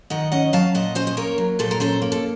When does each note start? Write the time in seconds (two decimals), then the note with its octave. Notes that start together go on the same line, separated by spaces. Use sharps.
0.10 D#3 D#5 F#5
0.32 C#4 D#5 F#5
0.53 F#3 F5 A5
0.74 A#2 D#5 F#5
0.95 C#4 C5 D#5
1.07 C5
1.17 A#3 A#4 C#5
1.38 F#3
1.59 A#2 A4 C5
1.71 A#4
1.80 C#4 A4 C5
2.02 A#3
2.12 A4